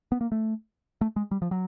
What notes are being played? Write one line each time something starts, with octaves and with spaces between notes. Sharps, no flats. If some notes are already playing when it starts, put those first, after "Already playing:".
B3
A#3
A3
A3
G#3
G3
F3
F#3